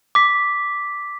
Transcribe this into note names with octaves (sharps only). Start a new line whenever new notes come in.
D6 B6